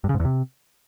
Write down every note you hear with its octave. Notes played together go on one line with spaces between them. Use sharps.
G2
C#3
G#2
E2
C3